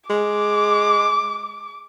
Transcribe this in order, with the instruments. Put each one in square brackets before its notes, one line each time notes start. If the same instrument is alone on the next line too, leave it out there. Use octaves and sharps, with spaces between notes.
[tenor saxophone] G#3 [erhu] D6